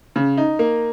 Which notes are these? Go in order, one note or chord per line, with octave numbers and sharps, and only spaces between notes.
C#3
D#4
A#3